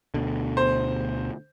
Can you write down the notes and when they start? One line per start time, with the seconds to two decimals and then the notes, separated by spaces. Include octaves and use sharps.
0.14 D2 B2 D3
0.57 C5